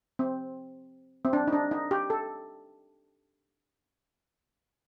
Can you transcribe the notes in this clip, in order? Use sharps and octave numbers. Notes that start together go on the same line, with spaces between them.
C4
C4
D4
D#4
D4
D#4
G4
A4